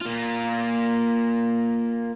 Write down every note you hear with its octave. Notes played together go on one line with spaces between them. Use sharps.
A#3 F4